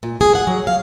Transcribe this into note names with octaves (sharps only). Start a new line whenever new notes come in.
A#2
G#4
F#5
F#3
F5